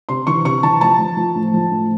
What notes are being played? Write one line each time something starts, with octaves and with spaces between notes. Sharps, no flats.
C3 C6
E3 C#6
C3 C#6
E3 A5
F3 A5
F3
F3
A2
F3
A2